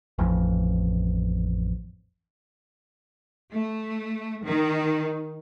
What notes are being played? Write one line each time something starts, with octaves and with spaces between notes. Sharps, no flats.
A1 F2
A3
D#3